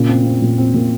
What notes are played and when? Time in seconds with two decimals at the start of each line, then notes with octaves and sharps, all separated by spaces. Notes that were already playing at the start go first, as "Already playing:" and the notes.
Already playing: A#2 C#3
0.09 C4
0.25 C4
0.42 A#2
0.58 C4
0.74 A#2